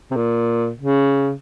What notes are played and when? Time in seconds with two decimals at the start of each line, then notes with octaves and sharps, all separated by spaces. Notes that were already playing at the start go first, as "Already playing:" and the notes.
0.11 C3
0.16 A#2
0.77 C#3